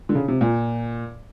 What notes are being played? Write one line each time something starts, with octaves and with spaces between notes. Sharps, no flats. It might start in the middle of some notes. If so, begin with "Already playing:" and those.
D3
C#3
C3
A#2